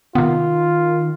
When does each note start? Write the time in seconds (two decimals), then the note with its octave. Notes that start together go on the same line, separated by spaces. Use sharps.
0.15 C3 D#3 B3 F4